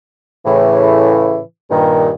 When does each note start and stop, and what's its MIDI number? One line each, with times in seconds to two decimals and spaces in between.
0.45 1.39 45
0.45 1.39 49
0.45 1.39 52
1.71 2.10 43
1.71 2.10 46
1.71 2.10 51